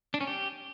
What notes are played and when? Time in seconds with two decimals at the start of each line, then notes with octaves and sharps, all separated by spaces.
0.14 D4
0.21 C#4
0.27 G4